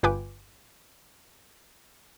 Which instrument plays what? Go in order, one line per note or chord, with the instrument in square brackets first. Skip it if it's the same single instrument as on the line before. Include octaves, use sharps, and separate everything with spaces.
[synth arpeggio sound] G1 F4 B4 G5 G#5 D6